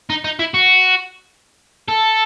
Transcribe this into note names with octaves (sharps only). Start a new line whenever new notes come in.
D#4
D#4
E4
F#4
A4